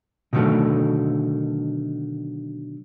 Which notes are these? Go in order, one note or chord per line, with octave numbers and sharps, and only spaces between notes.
B2 D3 D#3 F3 F#3 A3